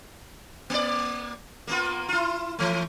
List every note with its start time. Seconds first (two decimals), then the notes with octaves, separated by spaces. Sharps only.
0.70 A#3 D5
1.67 A#3 B3 F4
2.09 E4 F4
2.59 E3 A3